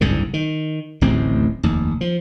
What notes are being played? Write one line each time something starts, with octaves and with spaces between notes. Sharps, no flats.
F#1 C2 G#2 D3
D#3
D1 A1 D#2 C4
F1 D#2
F3